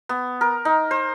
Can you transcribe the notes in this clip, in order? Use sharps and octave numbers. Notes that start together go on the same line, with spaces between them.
B3
A#4
D#4
C5